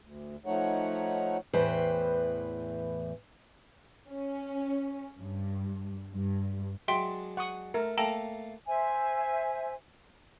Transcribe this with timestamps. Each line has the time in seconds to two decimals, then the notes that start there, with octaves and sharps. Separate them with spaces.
0.01 D2
0.46 F3 A3 D#4 C#5 F#5
1.53 E2 A2 E3 B4 C5 G5
4.10 C#4
5.19 G2
6.12 G2
6.88 F#3 G#3 D4 E5 G5 C6
7.37 F#5 C#6 D#6
7.74 A3 A#4
7.98 A3 A#3 A4 G5 A5 A#5
8.67 C5 E5 G#5